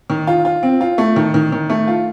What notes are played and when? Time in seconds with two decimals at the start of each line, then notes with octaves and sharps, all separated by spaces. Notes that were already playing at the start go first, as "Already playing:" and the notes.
0.10 D#3
0.27 F4
0.45 F4
0.63 C4
0.81 F4
0.98 A3
1.16 D#3
1.34 D#3
1.52 D#3
1.70 A3
1.87 F4